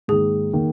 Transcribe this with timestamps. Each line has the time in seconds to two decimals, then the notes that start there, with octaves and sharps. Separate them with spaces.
0.08 G#2 D#3 A#3 G#4
0.53 D#3 A#3